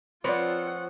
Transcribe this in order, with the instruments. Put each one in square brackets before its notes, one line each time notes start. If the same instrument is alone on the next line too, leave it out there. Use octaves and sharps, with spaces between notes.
[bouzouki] F3 C4 C#5 [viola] F4 F#5 [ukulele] B4 D5